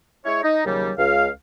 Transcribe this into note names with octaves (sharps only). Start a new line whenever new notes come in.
G#3 E4 C#5
D#4
D#2 C#3 F#3 G3
C#2 F5